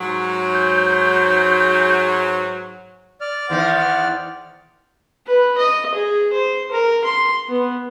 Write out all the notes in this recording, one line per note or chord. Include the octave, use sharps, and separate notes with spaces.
G#2 F#3
G6
D5 F6
E2 D#3 B3 C5 F#5
B4
D#5
G#4
C5
A#4
C6
B3